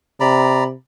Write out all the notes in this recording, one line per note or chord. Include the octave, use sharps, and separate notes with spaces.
C3 D5 A#5 B5